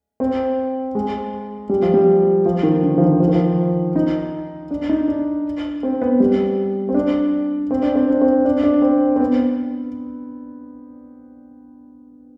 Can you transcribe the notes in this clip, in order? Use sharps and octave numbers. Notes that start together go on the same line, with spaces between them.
C4
G#3
G3
F3
G3
F3
D#3
D3
F3
D#3
F3
D#3
F3
D#4
D4
D#4
D4
C4
B3
G3
C4
D4
C4
D4
C4
D4
C4
D4
D4
C4
C4
B3